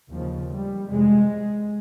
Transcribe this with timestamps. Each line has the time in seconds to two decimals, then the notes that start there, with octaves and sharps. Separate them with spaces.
0.10 D#2 C#3 F3
0.49 G3
0.88 F2 C3 G#3